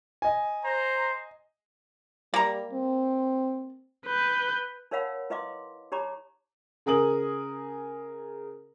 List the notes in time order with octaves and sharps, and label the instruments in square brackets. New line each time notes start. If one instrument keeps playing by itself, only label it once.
[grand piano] D#5 G#5
[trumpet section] C5 A#5
[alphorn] G3 [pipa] A#3 A#5
[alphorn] C4
[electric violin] B4 G6
[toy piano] D#4 A#4 C#5 F5 F#5 B5
E4 B4 D#5 F5 C6 D6
D#4 G4 C#5 A#5 B5 D6
[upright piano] C#3 G#4 A#4 D#6 F#7